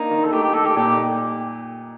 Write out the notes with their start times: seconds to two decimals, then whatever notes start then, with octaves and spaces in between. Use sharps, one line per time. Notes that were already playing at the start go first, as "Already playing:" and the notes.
Already playing: A#3 D4 D#4
0.11 D#3
0.24 A4
0.32 A3 G4
0.43 G4
0.54 D#4 A4
0.65 G4
0.76 A#2 G4